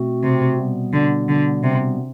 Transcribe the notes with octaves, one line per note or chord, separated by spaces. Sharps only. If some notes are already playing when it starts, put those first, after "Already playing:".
Already playing: B2 A3 C4 F#4
C3
B2 G3 B3
D3
D3
C3